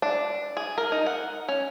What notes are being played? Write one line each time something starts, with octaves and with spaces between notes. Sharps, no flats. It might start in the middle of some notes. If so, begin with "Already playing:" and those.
D4
G#4
A#4
D#4
F#5
C#4